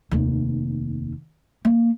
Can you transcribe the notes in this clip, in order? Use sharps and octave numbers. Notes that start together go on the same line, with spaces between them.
F1 D#2
A#3